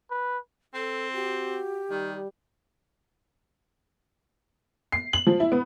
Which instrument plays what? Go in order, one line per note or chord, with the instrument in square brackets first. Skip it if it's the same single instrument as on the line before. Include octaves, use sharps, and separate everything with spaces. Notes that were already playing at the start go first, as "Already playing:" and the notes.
[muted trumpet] B4
[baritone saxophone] C4 [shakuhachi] A4
[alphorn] F#4 [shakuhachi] G4
[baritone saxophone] D#3 [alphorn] G3
[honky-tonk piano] C7
F#7
F3
E4
B3